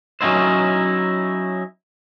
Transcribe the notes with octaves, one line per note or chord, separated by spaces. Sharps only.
F#3 C#4 D#4 E4 C5